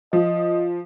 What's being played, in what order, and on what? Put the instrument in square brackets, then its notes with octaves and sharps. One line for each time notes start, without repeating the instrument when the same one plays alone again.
[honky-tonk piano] F3 [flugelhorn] D#5